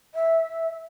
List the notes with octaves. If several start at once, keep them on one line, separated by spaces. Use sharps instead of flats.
E5